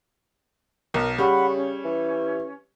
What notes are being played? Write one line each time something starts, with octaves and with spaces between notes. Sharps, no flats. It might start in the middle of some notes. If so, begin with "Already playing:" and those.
B1 A#4
C#3 G3 F#5 B5 C#6
C#4
E3